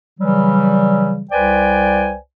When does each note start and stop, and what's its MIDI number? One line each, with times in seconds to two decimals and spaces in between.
0.19 1.24 49
0.19 1.24 52
0.19 1.24 54
0.19 1.24 55
1.31 2.16 36
1.31 2.16 71
1.31 2.16 72
1.31 2.16 74
1.31 2.16 79
1.31 2.16 80